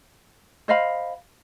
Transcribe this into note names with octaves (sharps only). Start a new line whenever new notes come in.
C5 D#5 F5 B5